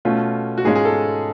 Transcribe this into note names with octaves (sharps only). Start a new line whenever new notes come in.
B2 A3 C#4 F4
F#4
G#2 G#3 C#4 F4 G#4
G#4
A4